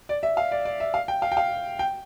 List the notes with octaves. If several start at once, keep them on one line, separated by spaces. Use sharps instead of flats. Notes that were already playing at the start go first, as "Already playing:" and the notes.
D5
E5
F5
D5
D5
E5
F5
G5
F5
G5
F5
G5